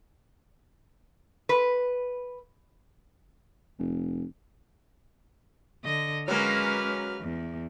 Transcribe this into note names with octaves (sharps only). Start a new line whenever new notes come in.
B4
F1
D3 D#5
F#3 G#3 A#3 C#4 B4 F6
E2